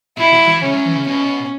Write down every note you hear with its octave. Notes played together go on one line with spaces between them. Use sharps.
B2 E4
F#3
E3
C#3 C#4
F#3
E3
C#3
B2 C#4